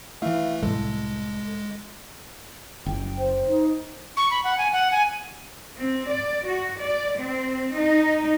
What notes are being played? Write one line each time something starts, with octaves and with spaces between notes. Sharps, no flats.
E3 A3 E4 E5 F5
C2 A2 G#3 A4
F#1 G5
C5
D#4
C#6
B5
F#5
G#5
F#5
G#5
C4
D5
F#4
D5
C4
D#4